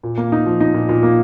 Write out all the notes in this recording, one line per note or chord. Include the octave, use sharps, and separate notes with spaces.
A#2
A#3
D#4
F3
D#4
A#2
A#2
A#3